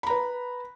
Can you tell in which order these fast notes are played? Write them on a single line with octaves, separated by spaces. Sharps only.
B5 A#5 B4